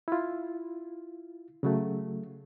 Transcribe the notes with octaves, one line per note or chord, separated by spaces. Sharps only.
E4 F4
C#3 F#3 A3